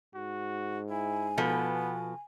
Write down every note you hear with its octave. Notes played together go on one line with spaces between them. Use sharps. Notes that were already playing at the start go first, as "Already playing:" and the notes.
G#2 F#4
E4 G#5
B2 F3 B3 A4